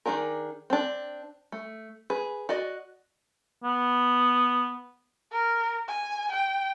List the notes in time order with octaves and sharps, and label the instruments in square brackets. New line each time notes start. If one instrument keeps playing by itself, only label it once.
[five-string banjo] D#3 G#3 D4 G#4 A#4
C4 D4
A3
G#4 B4
F#4 D5 D#5
[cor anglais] B3
[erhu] A#4
G#5
G5